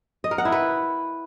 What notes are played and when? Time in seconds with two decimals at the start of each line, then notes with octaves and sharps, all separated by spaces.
0.24 D#5
0.31 A#4
0.38 F#5
0.45 E4
0.52 B4